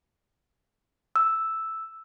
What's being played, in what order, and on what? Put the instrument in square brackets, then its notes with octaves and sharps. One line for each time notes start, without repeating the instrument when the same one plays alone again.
[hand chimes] E6